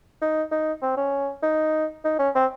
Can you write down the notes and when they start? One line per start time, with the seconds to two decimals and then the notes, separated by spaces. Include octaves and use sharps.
0.22 D#4
0.51 D#4
0.82 C4
0.97 C#4
1.43 D#4
2.04 D#4
2.19 C#4
2.35 C4